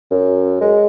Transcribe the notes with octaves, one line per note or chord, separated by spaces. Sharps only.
F#2
G#3